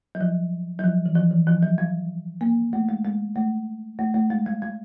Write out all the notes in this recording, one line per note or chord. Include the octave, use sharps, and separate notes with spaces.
F#3
F3
F#3
F3
E3
F3
E3
F3
F#3
G3
A#3
A3
G#3
G#3
A3
A3
A3
G#3
G3
G3